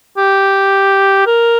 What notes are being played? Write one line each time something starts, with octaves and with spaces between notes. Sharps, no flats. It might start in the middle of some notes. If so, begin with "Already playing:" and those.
G4
A#4